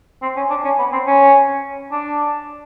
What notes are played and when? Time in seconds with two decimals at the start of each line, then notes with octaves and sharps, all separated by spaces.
0.22 C4
0.36 C#4
0.50 D4
0.64 C#4
0.78 B3
0.92 C4
1.07 C#4
1.91 D4